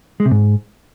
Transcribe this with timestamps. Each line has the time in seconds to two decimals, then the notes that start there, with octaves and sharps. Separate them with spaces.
0.20 G#3
0.25 C3
0.31 G#2